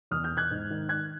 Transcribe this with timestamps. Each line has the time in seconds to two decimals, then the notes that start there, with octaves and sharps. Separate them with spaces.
0.11 E2 D#6 F6
0.24 F6 G6
0.31 B2
0.37 F#6 G#6
0.51 G#2
0.70 D#3
0.89 D#3 F#6 G#6